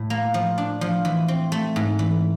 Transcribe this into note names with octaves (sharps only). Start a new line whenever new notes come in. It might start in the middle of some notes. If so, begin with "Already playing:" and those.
Already playing: A2
A#3
F3
D4
F3
E3
C4
A3
G#2
E3